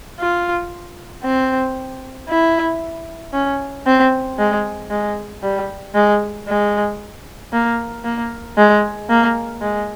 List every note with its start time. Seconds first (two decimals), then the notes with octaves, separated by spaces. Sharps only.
0.20 F4
1.24 C4
2.29 E4
3.33 C#4
3.86 C4
4.39 G#3
4.91 G#3
5.43 G3
5.95 G#3
6.48 G#3
7.53 A#3
8.04 A#3
8.57 G#3
9.10 A#3
9.62 G#3